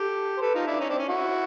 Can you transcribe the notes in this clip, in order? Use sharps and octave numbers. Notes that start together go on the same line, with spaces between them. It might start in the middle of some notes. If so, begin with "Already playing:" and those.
Already playing: G4 A4
C5
A4 B4
D#4 F4
D4 E4
C#4 D#4
C4 D4
C#4
E4 F#4